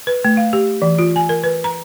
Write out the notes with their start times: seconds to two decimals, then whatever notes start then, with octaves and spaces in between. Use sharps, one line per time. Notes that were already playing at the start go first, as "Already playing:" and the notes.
0.07 B4
0.25 A3
0.37 F5
0.53 G4
0.82 E3
0.99 F4
1.16 G#5
1.29 A#4
1.44 B4
1.64 A#5